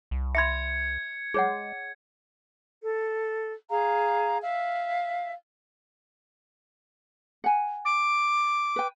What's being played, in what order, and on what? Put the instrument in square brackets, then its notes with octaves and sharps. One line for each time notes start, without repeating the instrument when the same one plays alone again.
[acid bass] C2
[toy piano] E5 B5 C6 [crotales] G#6 C#7
[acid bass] G#3 [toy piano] G#4 C#5 F#5
[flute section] A4
G#4 F5 A#5
E5 F5
[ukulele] F#5 G#5
[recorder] D6
[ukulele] B4 G5